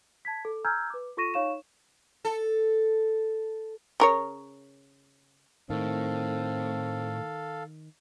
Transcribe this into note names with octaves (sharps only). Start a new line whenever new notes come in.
A5 G#6 B6
A4
G#5 A#5 E6 F6 G6 G#6
B4 D6
F4 A4 C#6 A#6 D#7 E7
D#4 C#5 F5 C#6 E7
A4
C#3 A#4 C#5
A2 D#3 C4 A4 F5